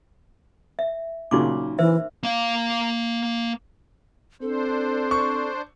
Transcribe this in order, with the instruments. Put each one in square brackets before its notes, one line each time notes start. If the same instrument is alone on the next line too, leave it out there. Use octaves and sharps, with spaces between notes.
[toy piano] E5
[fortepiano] A#2 C#3 F#3 [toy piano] D#4 C6 D6
[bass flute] E3 [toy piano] A#4 C5 E5
[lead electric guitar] A#3 F5
[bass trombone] C4 [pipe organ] D4 C5 [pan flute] A4
[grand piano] C#6